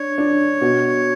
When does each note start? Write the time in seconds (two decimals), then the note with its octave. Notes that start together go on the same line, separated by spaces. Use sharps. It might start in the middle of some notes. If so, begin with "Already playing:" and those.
Already playing: D4 C#5
0.18 D4
0.61 B2